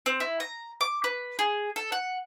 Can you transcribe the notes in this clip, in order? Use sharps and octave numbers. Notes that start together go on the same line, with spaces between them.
C4
E4
A#5
D6
B4
G#4
A4
F#5